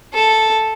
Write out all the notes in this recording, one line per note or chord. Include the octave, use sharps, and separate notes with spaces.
A4